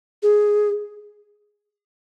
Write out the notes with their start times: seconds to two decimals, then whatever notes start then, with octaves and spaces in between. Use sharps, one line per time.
0.23 G#4